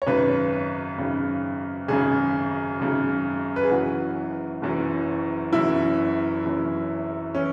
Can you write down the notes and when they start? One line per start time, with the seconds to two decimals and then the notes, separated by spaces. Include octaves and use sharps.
0.02 C#5
0.07 G#1 F#2 C#3 B4
0.98 G#1 F#2 C#3
1.88 G#1 F#2 C#3 G#4
2.80 G#1 F#2 C#3
3.56 B4
3.63 G#4
3.70 F#1 F#2 E3 F#4
4.62 F#1 F#2 E3
5.53 F#1 F#2 E3 E4
6.44 F#1 F#2 E3
7.35 E3 C#4